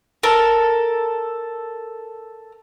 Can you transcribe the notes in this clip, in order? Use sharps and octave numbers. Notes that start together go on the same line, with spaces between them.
A4 A#4